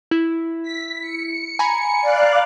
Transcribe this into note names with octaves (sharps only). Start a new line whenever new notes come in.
E4
B6
C#7
G#5 A#5 B5
D5 F5 F#6